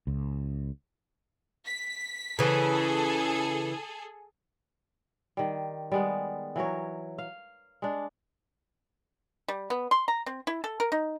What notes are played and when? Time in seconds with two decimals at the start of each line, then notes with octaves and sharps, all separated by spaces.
0.07 C#2
1.65 B6
2.39 C#3 E3 G#4 A4
5.37 D#3 G3
5.92 G3 G#3 B3
6.56 E3 F#3 A#4 C#5
7.18 F5
7.82 G#3 D4
9.48 G3
9.70 B3
9.91 C6
10.08 A#5
10.26 C4
10.47 E4
10.64 A4
10.80 A#4
10.92 D#4